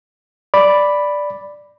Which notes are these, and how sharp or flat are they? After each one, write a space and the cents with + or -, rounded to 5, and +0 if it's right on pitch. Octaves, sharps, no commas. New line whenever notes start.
D5 +0 B5 +0